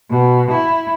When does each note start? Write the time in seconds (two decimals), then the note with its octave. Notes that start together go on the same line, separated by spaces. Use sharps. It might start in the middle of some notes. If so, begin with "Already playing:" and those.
0.10 B2
0.52 E4